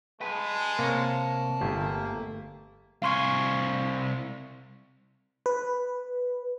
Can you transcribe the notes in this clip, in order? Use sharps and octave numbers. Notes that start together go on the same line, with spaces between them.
G#3 B4 G5 A5
C3 A#3 A#4 C#5
G1 A3 A#3 G4 G#4
C2 F5 G#5 C6 C#6
B4